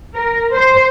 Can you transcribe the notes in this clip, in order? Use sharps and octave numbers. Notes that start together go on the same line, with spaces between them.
A#4
C5